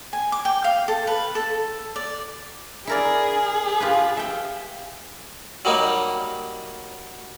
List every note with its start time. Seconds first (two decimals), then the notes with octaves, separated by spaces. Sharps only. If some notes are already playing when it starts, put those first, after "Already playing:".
0.13 G#5
0.32 D6
0.45 G5
0.64 F5
0.88 A4
1.07 B4
1.35 A4
1.96 D5
2.87 E4 G#4 A#4 D5
3.80 F4 G4 B4
4.17 E5 G5
5.65 F#3 G3 A#3 D#4